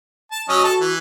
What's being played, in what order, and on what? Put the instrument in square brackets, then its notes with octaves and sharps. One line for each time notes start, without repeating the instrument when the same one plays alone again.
[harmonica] A5
[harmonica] F#3 C#4 D#5 [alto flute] F#4
[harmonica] A4 A5
E3